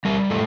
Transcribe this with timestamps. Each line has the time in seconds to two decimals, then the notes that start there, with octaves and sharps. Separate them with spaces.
0.05 G3 A#4
0.30 A2 A4